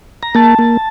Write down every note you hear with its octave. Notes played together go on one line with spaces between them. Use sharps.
A#5
A#3 A5
A#3